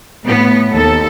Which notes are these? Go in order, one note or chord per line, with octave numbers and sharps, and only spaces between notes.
A2 B3
D#2 A4